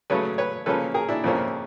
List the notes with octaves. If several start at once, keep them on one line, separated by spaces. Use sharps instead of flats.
C#3 F#3 A3 C#4 B4 C#5
B4 C#5
C#3 F3 A#3 C#4 A4 B4
G#4 A#4
D4 E4
F2 C#3 F3 A#3 C#4